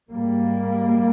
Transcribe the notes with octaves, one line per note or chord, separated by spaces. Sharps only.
G#2 G3 A#3